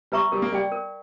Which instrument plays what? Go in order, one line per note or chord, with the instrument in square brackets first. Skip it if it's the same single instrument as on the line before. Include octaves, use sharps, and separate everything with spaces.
[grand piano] G3 [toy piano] B4 E5 A#5 C#6
[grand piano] G3 [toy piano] A#4
[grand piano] A#3
[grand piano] G3 [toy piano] D5 G5
[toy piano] A#4